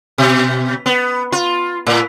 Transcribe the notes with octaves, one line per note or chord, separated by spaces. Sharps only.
B2
B3
F4
A2